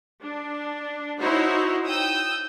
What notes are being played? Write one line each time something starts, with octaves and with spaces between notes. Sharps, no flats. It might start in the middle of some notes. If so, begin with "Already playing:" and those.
D4
D#4 E4 F#4 C5 C#5
G5 D#6 E6 G6